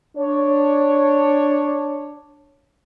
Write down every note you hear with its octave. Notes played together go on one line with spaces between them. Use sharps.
D4 C#5